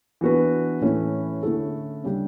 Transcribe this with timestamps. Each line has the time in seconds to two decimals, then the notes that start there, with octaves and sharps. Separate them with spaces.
0.21 E3 B3 D4 F#4 B4
0.81 A2 E3 A3 C#4 E4
1.43 D3 A3 C#4 E4 A4
2.04 C#3 G3 D4 G4